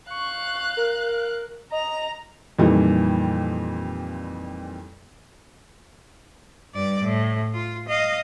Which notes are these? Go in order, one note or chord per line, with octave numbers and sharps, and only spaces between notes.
F5 C#6 F#6
A#4
D#5 A#5 F7
F2 A#2 D#3 E3 G3
G2 D5
A2
F4
D#5 F5